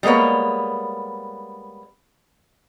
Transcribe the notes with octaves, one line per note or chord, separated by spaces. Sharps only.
G3 G#3 A#3 B3 C#5